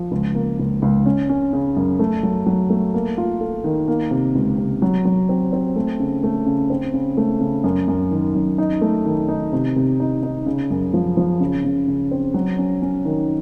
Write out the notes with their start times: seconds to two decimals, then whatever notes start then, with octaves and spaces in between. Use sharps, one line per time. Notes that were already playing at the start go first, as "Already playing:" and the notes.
Already playing: F3
0.11 C#2
0.35 A#3
0.59 C#2
0.82 C#2
1.06 C#4
1.29 C#4
1.53 C#3
1.77 F#2
1.99 A3
2.23 F#3
2.46 F#3
2.70 A3
2.94 A#3
3.18 F4
3.41 A4
3.64 D#3
3.88 A#3
4.11 C3
4.35 C#2
4.58 C3
4.82 F#3
5.05 F#3
5.29 C4
5.53 C4
5.76 A3
6.00 C#3
6.23 A3
6.46 C#3
6.70 C4
6.94 C#3
7.17 A3
7.41 C#3
7.64 F#2
7.88 F#2
8.11 D#3
8.35 F#2
8.58 D#4
8.81 A3
9.06 D#3
9.28 D#4
9.52 C3
9.76 C3
10.00 D#4
10.23 D#4
10.46 C#3
10.70 F#2
10.94 F3
11.17 F3
11.40 C#3
11.64 C#3
11.88 C#3
12.11 C4
12.34 F#3
12.58 C#4
12.82 C#4
13.05 D#3